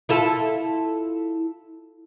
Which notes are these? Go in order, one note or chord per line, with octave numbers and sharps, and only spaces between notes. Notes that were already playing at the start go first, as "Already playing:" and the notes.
E4 F4 A4